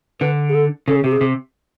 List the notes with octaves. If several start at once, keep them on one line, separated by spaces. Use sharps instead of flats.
D3 B4
G#4
A4
C#3 A4
G#4
C3 G4
G#4
C3